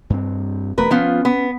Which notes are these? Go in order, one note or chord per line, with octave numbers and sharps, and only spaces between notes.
G2 C4
E1 A3 B3 A#4 B4
F3 B3 C#4 F4
B3